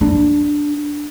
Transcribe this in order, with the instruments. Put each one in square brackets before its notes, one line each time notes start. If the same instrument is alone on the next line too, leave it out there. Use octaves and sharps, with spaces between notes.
[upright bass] D4